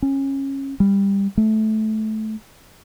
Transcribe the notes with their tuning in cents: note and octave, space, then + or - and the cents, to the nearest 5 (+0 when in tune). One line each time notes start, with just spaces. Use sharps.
C#4 -20
G3 +15
A3 -15